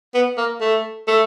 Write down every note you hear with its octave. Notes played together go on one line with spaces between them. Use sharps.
B3
A#3
A3
A3